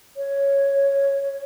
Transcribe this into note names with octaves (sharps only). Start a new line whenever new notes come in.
C#5